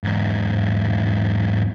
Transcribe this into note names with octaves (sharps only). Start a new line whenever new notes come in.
E2 G#2